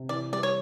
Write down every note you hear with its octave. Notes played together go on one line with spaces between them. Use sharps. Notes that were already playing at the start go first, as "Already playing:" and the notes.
Already playing: C3
E3 D5
G3 D5
C#5